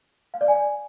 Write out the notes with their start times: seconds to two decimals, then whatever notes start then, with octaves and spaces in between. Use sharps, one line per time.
0.34 F5
0.41 D5
0.48 G#5